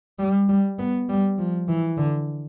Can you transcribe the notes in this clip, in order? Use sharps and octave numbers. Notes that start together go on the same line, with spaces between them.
G3
G3
B3
G3
F3
E3
D3